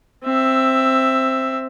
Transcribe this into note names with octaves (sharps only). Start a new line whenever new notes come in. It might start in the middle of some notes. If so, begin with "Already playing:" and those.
C4 E5